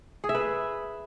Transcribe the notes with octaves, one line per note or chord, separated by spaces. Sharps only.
G#4
E5
B4